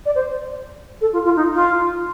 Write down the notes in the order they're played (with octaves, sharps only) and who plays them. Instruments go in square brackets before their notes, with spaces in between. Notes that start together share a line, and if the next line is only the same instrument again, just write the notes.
[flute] D5
C5
A4
F4
F4
D#4
F4